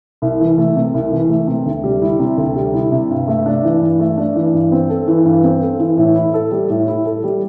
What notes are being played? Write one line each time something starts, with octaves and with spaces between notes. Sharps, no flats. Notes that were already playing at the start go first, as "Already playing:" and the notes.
C2
E3
A3
C3
C2
E3
A3
C3
D2
G3
E4
C3
D2
G3
E4
C3
G2
A3
D4
E3
G2
A3
D4
E3
G2
C4
A4
E3
G2
C4
A4
E3
A2
E4
A4
G3
A2
E4
A4
G3